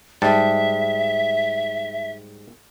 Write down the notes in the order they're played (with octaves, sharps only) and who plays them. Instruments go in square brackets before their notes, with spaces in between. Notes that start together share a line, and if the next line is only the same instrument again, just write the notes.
[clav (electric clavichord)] G#2 G3 A5 [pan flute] E5